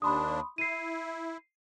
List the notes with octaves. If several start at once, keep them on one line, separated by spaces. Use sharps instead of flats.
D#2 D4 B5 C6 D#6
E4 C7 D#7